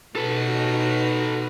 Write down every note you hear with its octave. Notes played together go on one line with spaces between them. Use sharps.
B2 D#4 F#4 A4 B4